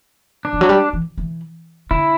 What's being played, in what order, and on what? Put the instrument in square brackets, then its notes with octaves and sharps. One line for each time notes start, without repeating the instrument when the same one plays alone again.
[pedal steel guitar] D4
[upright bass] E3
F#3
G3
E3
E3
[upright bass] D3 [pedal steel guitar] E4